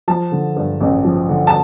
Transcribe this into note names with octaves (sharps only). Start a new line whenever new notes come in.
F3 A5
D3
G2
A1
F3
D3
A5